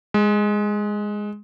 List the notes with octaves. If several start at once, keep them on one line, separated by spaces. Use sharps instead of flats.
G#3